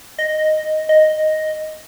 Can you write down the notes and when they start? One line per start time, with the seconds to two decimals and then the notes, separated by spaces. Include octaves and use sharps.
0.19 D#5
0.89 D#5